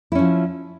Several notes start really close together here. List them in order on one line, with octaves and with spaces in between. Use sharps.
E4 C#4 F3